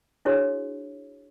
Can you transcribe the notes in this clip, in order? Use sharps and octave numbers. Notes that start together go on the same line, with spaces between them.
D4 E4 F#4 G#4 C5 C#5